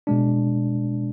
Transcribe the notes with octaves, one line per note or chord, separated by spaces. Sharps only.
B2 G#3 D4